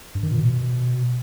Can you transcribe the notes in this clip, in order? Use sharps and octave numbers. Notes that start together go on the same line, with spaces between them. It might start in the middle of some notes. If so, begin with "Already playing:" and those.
G2
D#3
A#2
B2